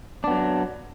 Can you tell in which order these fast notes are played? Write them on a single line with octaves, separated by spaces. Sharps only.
D4 B3 F#3